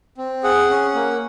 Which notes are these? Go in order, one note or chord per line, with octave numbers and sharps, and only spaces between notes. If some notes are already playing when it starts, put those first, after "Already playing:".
C4
G#4 F#5
C#4
A#3